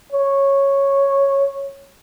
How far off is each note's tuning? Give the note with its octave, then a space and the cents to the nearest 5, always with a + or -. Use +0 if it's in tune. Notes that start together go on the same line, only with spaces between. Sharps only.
C#5 -5